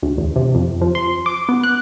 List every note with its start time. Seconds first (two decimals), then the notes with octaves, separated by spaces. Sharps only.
0.03 D2
0.18 E2
0.36 C3
0.55 F2
0.81 F3
0.95 C6
1.26 D6
1.49 B3
1.64 F#6